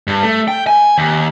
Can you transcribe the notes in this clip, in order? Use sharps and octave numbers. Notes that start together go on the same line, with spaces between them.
G2
A3
G5
G#5
D#2